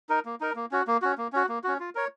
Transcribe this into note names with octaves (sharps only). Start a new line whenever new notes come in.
D#4 A#4
A#3
D#4 A#4
A#3
C#4 F#4
A#3
C#4 F#4
A#3
C#4 F#4
A#3
C#4 F#4
F4
A#4 C#5